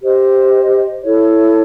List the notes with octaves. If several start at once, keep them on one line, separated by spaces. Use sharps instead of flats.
G4 C5 D#5
E4 A4 C#5